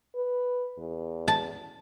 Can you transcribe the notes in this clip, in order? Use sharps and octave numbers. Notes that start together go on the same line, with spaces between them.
B4
E2
A5